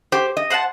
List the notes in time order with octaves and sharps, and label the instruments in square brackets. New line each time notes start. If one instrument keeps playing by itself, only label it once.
[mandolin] G4 [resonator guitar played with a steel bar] C5
[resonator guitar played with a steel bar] D#5
[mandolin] C5 F#5 A5